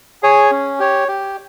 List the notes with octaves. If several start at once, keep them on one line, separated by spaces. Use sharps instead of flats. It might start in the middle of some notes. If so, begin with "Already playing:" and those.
G#4 C#5 G#5
C#4
G4 C#5
G4